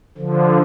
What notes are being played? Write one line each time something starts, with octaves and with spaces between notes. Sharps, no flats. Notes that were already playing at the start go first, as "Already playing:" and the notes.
D3 F3